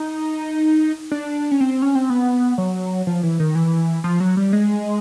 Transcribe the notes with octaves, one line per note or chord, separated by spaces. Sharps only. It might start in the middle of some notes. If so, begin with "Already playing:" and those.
Already playing: D#4
D4
C#4
C4
C#4
C4
B3
F#3
F3
E3
D#3
E3
F3
F#3
G3
G#3